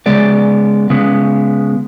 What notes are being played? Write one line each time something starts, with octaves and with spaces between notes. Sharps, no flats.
C#3 G#3 B3 D5
C#3 G#3 B3